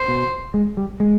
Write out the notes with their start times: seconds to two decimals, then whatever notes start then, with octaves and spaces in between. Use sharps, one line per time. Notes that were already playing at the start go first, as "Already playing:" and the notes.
Already playing: C5
0.08 B2
0.54 G#3
0.77 G3
1.00 G#3